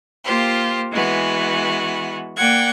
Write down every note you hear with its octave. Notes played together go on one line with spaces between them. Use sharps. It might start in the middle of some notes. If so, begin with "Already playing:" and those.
A#3 F4 G4 C5
E3 G#3 B3 F#4
A#3 D5 F#5 G5 G#6